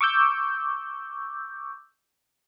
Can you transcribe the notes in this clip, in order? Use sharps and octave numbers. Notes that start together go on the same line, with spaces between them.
C#6 D6 E6 G6